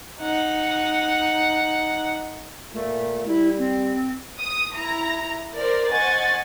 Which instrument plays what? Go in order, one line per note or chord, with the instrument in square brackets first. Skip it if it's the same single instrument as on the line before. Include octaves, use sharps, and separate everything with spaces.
[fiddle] D#4 F#5
[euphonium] A#2 [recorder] A3
[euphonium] G3 [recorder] E4
[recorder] C4
[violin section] D#6
E4 A#5
A#4 C5 D5
C5 D#5 F#5 G#5 C#6 A6